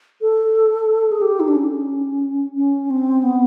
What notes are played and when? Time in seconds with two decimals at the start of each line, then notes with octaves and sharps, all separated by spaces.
0.21 A4
1.11 G#4
1.22 G4
1.40 D#4
1.48 D4
1.56 C#4
2.56 C#4
2.90 C4
3.23 B3